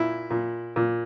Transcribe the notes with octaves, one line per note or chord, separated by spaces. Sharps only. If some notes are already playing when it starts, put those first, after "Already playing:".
Already playing: A#2 E4
A#2
A#2